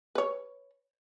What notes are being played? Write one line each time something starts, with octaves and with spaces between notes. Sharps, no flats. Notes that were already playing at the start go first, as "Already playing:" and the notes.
B4 C#5